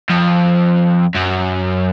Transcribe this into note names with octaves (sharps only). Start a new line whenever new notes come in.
F2
F#2